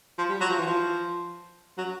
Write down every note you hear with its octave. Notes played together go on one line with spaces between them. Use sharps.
F3
G3
F#3
F3
E3
F3
F#3